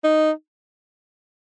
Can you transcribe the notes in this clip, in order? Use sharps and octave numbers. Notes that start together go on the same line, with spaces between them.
D#4